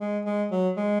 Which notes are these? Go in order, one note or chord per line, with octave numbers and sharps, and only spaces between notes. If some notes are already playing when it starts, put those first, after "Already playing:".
G#3
G#3
F#3
G#3